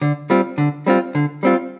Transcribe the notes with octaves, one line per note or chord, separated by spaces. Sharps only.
D3
G3 C4 F4
D3
G3 C4 F4
D3
G3 C4 F4